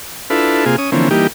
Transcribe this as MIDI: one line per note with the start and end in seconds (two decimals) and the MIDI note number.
0.30 0.65 62
0.30 0.65 64
0.30 0.65 65
0.30 0.65 69
0.30 0.65 71
0.66 0.76 48
0.66 0.76 58
0.66 0.76 65
0.66 0.76 68
0.78 0.90 61
0.78 0.90 87
0.92 1.09 50
0.92 1.09 52
0.92 1.09 53
0.92 1.09 58
0.92 1.09 60
0.92 1.09 61
1.11 1.27 52
1.11 1.27 55
1.11 1.27 58
1.11 1.27 63
1.11 1.27 67